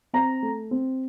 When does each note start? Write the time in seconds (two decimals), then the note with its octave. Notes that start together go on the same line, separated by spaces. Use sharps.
0.13 C4 A#5
0.43 A3
0.71 C4